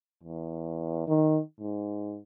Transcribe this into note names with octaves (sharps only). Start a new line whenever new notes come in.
E2
D#3
G#2